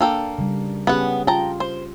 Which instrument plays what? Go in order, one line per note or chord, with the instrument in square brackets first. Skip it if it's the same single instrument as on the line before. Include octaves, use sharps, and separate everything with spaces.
[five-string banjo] A#3 A4 G5 [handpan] D4
[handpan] C#3 G3
[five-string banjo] B3 F#5 [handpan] C#4 G4 G#4
[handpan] F4 [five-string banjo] G5 A5 A#5
[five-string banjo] C5